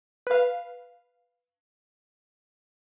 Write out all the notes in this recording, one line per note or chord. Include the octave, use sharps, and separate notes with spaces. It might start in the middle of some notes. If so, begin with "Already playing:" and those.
B4 F5